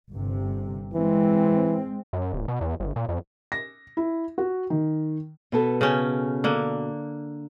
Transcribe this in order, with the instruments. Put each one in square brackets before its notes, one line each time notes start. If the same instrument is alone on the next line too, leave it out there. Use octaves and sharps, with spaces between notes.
[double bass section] G1 C3
[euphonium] E3 [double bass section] G#3 C4
[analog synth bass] F#2
D1
B2
E2
G1
A#2
F2
[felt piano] A#6
E4
F#4
D#3
[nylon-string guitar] B2 B3 A4
[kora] C#3 C#4 G5
D3 A#3